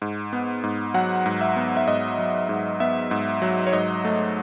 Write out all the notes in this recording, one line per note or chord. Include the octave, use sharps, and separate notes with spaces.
G#2
B3
G#2
F#3 F#5
G#2
E5
B3
E5
G#2 D#5
F#3
G#2
B3 E5
G#2
F#3
C#5
G#2 D#5
A3